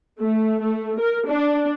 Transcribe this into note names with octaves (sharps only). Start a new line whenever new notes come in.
A3
A3
A#4
D4